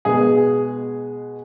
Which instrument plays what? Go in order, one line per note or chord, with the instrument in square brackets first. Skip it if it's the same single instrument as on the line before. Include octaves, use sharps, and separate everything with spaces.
[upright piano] B2 G#3 B3 G#4